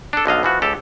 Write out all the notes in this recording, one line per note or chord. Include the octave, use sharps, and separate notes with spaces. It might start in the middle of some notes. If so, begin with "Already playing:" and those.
D4 A4
B1 D3 D#5 F5
E3 F3 F#4
C#2 G4 A4